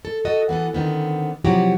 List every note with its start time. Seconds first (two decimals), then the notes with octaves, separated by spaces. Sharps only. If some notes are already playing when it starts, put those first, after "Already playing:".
0.05 A4
0.25 F#4 A4 D#5
0.49 E3 B3 F#4 A4
0.73 D3 D#3 B3 C4
1.45 C3 F3 F#3 E4 F#4 G4